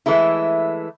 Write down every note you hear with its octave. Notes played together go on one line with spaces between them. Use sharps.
E3 G#3 A3 E4